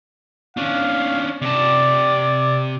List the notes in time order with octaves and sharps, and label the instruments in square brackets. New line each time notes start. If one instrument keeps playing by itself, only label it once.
[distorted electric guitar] C#4 D4 [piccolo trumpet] F5
[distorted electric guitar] C3 A5 [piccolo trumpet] D5